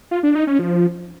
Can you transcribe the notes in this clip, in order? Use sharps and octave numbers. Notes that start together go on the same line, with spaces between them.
F4
D4
D#4
C#4
F3